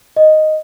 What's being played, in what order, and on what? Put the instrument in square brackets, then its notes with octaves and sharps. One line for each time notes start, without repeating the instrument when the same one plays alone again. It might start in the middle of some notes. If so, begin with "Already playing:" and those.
[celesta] D#5